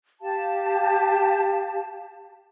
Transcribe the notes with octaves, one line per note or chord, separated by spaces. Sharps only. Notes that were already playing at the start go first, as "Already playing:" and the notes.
G4 F5 A5